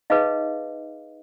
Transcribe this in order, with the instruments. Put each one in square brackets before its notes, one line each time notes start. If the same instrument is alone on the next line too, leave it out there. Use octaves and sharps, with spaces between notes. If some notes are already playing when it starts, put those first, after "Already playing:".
[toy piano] D#4 G#4 B4 D#5 F5